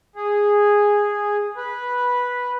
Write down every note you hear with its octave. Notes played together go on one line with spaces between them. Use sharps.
G#4
B4